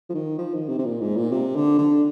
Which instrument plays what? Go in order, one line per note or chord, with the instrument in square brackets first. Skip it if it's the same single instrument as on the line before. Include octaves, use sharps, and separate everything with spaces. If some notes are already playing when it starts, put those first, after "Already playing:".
[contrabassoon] F3
D#3
F3
D#3
C3
C3
A#2
G#2
A#2
C3
D3
D3